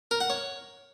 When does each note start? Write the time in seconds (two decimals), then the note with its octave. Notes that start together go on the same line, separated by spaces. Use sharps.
0.11 A#4
0.20 F#5
0.30 C#5